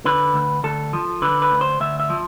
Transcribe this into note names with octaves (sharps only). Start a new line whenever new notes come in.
D3 B4
D2
D2 A4
F3
D3 B4
B4
D2
C5
D2 E5
E5
F3